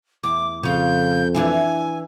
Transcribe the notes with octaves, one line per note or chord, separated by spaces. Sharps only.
E2 D6
F2 C#3 F4 G6
E3 D4 E4 G#5